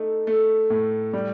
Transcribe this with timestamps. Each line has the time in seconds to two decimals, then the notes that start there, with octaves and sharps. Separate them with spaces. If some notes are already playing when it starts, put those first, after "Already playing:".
Already playing: A3 D#4
0.27 A3
0.70 A2
1.13 G3